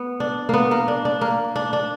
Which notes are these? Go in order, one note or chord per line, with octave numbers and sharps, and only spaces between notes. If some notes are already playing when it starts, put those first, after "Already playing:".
Already playing: B3
D4
A#3 B3
A#3
D4
D4
A#3
D4
D4